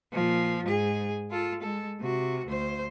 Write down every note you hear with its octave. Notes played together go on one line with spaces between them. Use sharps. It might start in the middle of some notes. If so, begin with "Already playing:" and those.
A#2 F3
G#2 G#4
F4 A4
G#3 A4
C3 F#4
D2 C5